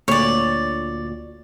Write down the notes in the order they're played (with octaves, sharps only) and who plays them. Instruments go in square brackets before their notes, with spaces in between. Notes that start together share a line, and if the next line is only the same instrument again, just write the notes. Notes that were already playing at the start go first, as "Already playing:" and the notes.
[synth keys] D2 A#2 [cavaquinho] C#5 D5